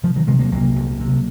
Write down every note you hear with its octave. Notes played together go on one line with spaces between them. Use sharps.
C3 F3
D#3 F#3
C3 F3 G#3
F#3 A#3
C2 F#3 A#3
C2
C3